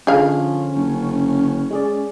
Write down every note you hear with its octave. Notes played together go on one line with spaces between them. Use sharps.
D3 F3 C#4 G#4 F5
F#1
G#3 G#4 D5